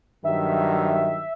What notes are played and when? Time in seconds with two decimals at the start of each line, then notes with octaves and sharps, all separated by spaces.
0.25 G2 D#3 F#3 E5